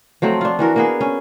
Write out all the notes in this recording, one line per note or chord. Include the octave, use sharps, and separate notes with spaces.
F3 F#3 A3 C4
D4 F4
E3 F#4 A#4
A#3 B3 G#4
C#4